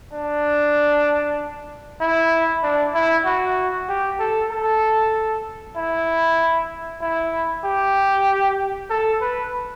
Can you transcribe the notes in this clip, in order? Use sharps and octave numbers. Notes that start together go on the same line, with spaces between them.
D4
E4
D4
E4
F#4
G4
A4
A4
E4
E4
G4
A4
B4